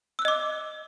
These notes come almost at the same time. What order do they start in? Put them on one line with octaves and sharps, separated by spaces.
E6 F#6 D#5 D6